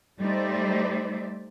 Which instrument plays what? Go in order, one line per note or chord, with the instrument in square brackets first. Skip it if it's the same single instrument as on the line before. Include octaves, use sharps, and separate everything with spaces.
[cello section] G3 A3 D#4 C5 D5 E5